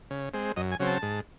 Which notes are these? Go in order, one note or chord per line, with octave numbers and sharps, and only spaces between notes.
C#3
G#3 C4
F#2 D#5
G#5
C#3 F#3 C4
A5
G#2